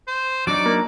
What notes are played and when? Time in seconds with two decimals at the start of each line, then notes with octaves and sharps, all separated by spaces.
0.07 C5
0.47 F#3 D4 D#4 D5 D7
0.66 A#3